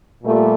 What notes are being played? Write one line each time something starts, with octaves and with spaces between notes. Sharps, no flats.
A#2 G3 A3